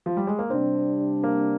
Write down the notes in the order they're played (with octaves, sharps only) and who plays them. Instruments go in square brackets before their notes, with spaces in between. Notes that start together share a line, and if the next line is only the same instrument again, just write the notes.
[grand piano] F3
G3
G#3
A#3
[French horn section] C3 G3 D4 [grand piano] C4
[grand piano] A#3